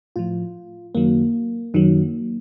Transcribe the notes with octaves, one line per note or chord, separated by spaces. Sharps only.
A2 F3 F4
F#2 D#3 F#3 A#3
F#2 D#3 F#3